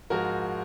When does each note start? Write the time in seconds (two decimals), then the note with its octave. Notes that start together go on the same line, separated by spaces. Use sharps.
0.10 G#2 F3 G#3 F#4 A#4